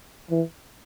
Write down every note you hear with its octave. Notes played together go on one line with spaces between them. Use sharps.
E3